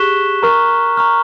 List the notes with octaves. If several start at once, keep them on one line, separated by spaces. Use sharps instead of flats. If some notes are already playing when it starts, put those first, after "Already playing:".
Already playing: G4 G#4 C#6 F#6 B6 E7 G7
A#4 A#5 C#6 F6
A#5 C#6 F6